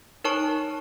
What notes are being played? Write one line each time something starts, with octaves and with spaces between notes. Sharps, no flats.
D#4 A#4 C#5 A5 C#6